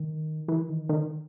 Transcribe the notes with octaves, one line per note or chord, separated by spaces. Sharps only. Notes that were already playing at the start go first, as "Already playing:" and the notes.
Already playing: D#3
E3
D#3
D#3